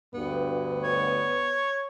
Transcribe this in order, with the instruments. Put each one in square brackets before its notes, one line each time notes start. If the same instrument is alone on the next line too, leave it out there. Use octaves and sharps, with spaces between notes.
[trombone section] D2 G2 [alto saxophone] B3
[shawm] C#5